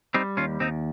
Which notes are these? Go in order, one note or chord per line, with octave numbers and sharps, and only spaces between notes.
G3 C4 D#4
D#2 C#4 F4
D#2 C4 D#4